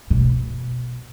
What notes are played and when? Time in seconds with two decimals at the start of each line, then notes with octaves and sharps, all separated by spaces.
0.10 B2